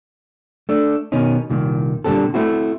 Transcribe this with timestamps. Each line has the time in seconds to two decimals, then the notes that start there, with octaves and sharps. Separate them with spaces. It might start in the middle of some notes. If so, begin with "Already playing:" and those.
0.69 A3 D4
1.12 B2 D#3 C#4 D#4
1.50 C2 A#2 D#3
2.04 A#2 D3 G3 C4 A4
2.34 A3 C4 E4 F#4